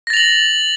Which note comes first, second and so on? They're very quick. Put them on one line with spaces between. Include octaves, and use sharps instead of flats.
A#6 A6 F7 F#7